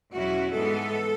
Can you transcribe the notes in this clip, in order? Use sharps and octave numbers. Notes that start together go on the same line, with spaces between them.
E2 B2 F#3 C#4 E4 F#4
G#2 E3 G#3 B3 A4